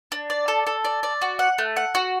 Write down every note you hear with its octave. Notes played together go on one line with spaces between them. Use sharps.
D4
D5
A4
A4
D5
D5
F#4
F#5
A3
F#5
F#4